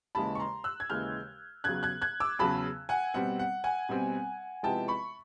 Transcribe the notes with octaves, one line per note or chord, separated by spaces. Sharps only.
D#2 C#3 E3 G#3 A5 B5
C#6
A#5 C6
E6 F#6
G#6
D#2 C#3 E3 G#3 F6 G6
E2 C#3 F#3 F#6 G#6
F#6 G#6
F#6 G#6
D6 E6
E2 C#3 F#3 A5 B5
F#5 G#5
B2 G3 C4 F#5
F#5
F#5 G#5
B2 G3 C4
C3 F3 G#3 B3 E4 G5 A5
B5 C#6